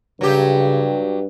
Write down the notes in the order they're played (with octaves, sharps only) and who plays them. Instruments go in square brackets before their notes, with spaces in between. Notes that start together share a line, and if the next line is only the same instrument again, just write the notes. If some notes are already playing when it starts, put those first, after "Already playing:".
[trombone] G2 [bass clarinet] C#3 [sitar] F#3 G4